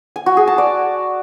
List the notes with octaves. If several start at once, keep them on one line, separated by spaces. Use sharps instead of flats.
G#5
F#4
G#4
A5
D5